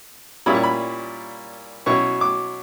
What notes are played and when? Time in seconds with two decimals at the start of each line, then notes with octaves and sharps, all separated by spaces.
0.46 A#2 G3 C#4 E4 B5
0.55 C#6
0.63 B5
1.86 B2 F#3 C#4 E4 C#6
2.21 D6